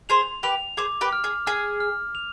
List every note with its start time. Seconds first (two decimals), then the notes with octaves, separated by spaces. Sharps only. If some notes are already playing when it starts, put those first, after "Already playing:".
0.09 G#4 C5 F7
0.43 G4 B4 F7
0.77 G#4 C5 D6
1.01 G4 B4
1.13 F6
1.24 G#4
1.47 G#4 F6
1.80 F6
2.15 F7